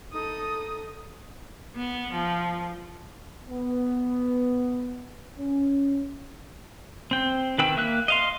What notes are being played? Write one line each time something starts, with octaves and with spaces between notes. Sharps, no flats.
D#4 A4 D#6
B3
F3
B3
C#4
C4 G5
D#3 B4 G5 E6
A#3 E5 E6 F#6
D#5 F5 C6